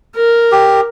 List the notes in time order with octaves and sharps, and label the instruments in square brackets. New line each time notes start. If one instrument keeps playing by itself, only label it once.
[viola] A#4
[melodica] G4